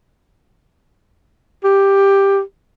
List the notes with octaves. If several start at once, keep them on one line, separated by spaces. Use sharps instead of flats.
G4